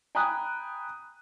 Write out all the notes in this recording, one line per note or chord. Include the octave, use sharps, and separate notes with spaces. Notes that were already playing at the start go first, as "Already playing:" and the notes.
G5 G#5 A#5 B5 D#6 F#6